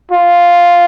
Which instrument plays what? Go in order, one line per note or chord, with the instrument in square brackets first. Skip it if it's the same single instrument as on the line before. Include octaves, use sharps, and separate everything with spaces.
[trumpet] F4